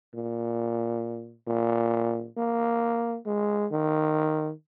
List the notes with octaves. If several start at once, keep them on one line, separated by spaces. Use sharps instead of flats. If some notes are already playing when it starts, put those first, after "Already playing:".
A#2
A#2
A#3
G#3
D#3